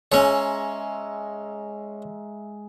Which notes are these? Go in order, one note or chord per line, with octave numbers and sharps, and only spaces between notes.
G#3 C#4 C#5 E5 A#5